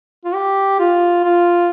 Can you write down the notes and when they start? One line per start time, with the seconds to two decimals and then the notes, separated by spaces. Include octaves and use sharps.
0.25 F4
0.34 G4
0.79 F4
1.23 F4